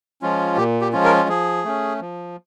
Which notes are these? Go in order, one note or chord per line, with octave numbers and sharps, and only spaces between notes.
F3 G#3 C#4 F4
A#2 G4
G4
F3 G#3 C#4 F4
A#4
F3 G#4
A3 C#4
F3